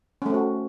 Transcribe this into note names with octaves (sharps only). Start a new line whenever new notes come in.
A3 C4 C#4 F#4